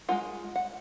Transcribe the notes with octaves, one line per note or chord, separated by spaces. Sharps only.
G#3 C4 F4 F#5
F#5